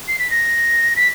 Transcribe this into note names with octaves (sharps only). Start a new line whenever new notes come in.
C7
B6
A#6
B6